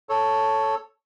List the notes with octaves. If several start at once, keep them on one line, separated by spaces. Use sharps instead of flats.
A4 C#5